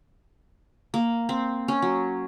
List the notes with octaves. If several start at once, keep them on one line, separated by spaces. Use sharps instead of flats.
A#3
C4
C#4
F#3